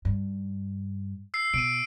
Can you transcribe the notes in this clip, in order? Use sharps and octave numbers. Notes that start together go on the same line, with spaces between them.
G2
E6 C7
B2 D7 D#7